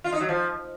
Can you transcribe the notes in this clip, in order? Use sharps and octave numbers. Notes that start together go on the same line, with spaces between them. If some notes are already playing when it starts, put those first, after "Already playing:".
F4
D#4
F#3
F3